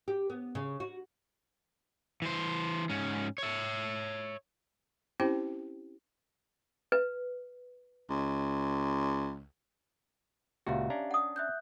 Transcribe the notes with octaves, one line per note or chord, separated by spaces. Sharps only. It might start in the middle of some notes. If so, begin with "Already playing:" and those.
G4
B3
C#3
F#4
E3 C5
G#2 C#4
C#5 E5
C4 C#4 E4 G4 C5 G5
B4
C#2
C#2 A#2 F#4 G4 E5 F5
C#4 D4 A#5
F#5 D#6
E5 F#6 G6